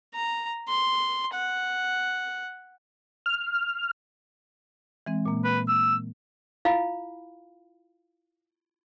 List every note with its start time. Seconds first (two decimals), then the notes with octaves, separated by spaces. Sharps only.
0.14 A#5
0.68 C6
1.34 F#5
3.26 F6
5.06 E3 G#3 C4
5.26 A#2 A#3
5.44 B4
5.68 E6
6.65 E4 F4 F5 B5